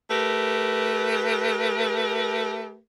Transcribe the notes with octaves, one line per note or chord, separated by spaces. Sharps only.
A3 G4 A#4 B4